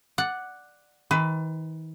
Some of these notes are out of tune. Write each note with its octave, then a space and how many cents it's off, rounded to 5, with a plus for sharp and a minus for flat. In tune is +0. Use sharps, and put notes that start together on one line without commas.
D5 +5 F#5 +0
D#3 +45 B4 +30